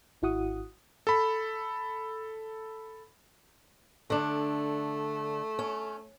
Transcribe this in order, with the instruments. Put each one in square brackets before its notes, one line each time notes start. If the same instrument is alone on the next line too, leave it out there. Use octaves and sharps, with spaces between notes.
[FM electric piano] G#1 E4 F#4 F#5 D#6
[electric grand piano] A4 B5
[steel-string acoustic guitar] D3 D4 [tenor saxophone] A3
[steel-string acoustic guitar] C#4